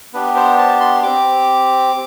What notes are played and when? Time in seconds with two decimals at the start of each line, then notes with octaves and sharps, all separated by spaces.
0.13 B3 D4 G4 B4
0.36 C5
0.58 A5
0.81 C6
1.03 C4 G4 D6